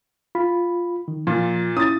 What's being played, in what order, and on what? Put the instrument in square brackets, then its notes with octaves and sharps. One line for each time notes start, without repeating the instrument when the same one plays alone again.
[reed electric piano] F4 B5
D#3
[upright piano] A#2 [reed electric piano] F3
[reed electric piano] C#4 E4 A#5 [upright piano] D#6 A6